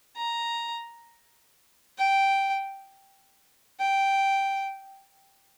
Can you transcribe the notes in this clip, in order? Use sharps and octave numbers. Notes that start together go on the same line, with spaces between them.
A#5
G5
G5